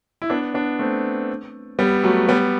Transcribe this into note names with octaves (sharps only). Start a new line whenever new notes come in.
E4
B3 D4
B3 D4
A3 C4
G3 B3
F#3 A3
G3 B3